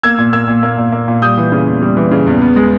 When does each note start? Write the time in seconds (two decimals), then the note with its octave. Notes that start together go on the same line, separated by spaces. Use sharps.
0.03 A#3 E6 G#6
0.19 A#2
0.33 A#3 E6 G#6
0.48 A#2
0.63 A#3
0.78 A#2
0.92 A#3
1.08 A#2
1.22 G3 D#6 G6
1.37 E3
1.52 C#3
1.67 E2
1.82 G3
1.97 E3
2.11 C#3
2.26 E2
2.41 B3
2.56 G#3